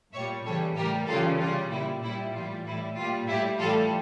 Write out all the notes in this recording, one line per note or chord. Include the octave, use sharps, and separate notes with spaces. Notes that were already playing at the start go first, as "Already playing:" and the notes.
A#2 G3 C#5 E5
C#3 E3 G3 A4 C#5
A2 G3 G4 A#4
C#3 E3 G3 F4 A4
C#3 G3 F4
A#2 G3 E4
A#2 G3 E4
A2 E3 G3 F4
A2 G3 E4
A#2 G3 F4
A2 G3 E4 G4
A2 E3 G3 F4 A4